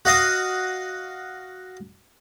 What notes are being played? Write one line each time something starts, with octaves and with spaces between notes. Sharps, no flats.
F#4 D#5 F5 D#6